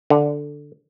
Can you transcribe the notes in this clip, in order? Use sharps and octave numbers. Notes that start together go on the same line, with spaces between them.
D3